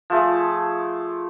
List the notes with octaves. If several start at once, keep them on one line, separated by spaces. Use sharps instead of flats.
F3 A3 G#4